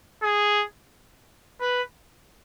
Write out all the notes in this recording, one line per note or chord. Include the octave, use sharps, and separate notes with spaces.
G#4
B4